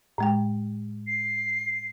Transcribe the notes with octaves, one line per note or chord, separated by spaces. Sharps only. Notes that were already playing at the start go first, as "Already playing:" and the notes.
A2 G#3 G5
C7